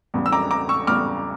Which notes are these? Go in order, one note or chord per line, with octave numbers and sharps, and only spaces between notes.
E2 C#3 G3
E6
A#5 D6
A#5 D6
C#6 E6
E2 C#3 G3 D6 F6